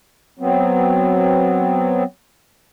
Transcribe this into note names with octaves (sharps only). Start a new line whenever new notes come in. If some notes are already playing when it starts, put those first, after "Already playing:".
F#3 B3 C4